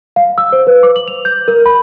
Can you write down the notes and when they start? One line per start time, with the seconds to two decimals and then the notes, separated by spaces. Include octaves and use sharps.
0.16 F5
0.38 E6
0.52 C5
0.67 B4
0.83 D6
0.96 F#7
1.08 F7
1.25 G6
1.48 A#4
1.66 B5